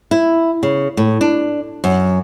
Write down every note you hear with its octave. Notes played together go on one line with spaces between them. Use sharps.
E4
C#3
A2
D4
F#2